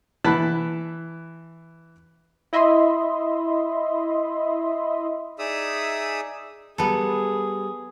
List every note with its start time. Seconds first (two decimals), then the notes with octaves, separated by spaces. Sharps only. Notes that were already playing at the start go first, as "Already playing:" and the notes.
0.24 E3 A5 B5 F#6
2.53 E4 D#5 E5 B5 C6 D#6
5.39 D#4 G#4 D5 E5 D#6 E6
6.78 G3 B3 G#4 A4 A#5